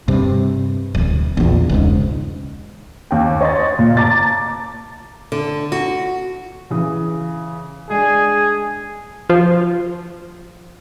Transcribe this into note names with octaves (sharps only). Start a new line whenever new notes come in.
G2 C3
D1
A#1 E2
E1 C#2 G#2
D#2 G5
C#5 D#5 C6 A6
A#2
A5 A#5 D6 A6
D3
F#4
C#3 E3 D#6
G#3 D4 G#4
F3